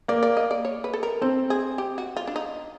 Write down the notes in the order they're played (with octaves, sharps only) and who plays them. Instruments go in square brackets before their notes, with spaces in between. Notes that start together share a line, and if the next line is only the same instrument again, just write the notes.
[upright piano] A#3 [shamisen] D5
[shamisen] D5
D#5
D5
C#5
B4
A4
A#4
[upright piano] C4 [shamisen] A4
[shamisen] G#4
G4
F#4
F4
D4
D#4